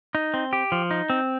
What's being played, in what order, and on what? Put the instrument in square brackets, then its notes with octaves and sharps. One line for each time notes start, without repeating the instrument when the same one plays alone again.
[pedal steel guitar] D#4
C4
G4
F3
D#4
C4